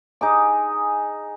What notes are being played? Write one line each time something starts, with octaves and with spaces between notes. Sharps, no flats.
D#4 G#4 D6